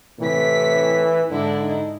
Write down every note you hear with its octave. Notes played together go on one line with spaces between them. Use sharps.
A2 C3 E3 B6
G#2 D3 D4 E4
D#4